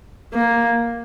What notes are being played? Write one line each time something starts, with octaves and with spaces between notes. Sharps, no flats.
A#3